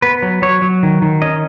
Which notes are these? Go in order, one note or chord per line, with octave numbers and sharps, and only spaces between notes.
B3 B4
F#3
F#3 C#5
F#3
D#3
D#3
C#4 D#5